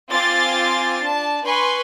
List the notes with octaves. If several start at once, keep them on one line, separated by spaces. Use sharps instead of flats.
C4 F4 G#5 C6 D6 A6
D4 A5
B4 G#5 C6 C#6